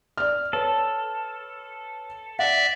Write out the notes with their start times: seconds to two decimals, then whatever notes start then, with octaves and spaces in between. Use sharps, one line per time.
0.17 D5 F6
0.53 A4 B4 C#5
2.39 D5 E5 F#5